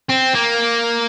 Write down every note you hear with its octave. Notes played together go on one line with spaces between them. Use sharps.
C4
A#3